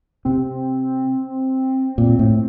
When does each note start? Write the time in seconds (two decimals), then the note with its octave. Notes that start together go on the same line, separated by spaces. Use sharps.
0.25 C3 C4
1.98 A#2
2.19 A2